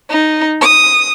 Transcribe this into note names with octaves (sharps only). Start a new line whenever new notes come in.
D#4
D#6